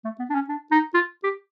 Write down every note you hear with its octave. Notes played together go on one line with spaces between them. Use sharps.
A3
B3
D4
C#4
D4
D#4
F4
G4